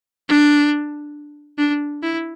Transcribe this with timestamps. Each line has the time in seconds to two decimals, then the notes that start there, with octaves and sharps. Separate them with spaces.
0.29 D4
1.58 D4
2.03 E4